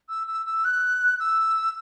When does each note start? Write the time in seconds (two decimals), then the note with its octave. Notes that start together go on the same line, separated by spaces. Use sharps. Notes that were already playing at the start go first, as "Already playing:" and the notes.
0.09 E6
0.27 E6
0.46 E6
0.64 F#6
1.19 E6